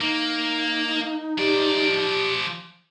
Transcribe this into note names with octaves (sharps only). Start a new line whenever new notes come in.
A#3 D#4
F3 G4 D5